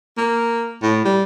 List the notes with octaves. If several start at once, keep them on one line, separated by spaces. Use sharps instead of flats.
A#3
A2
G3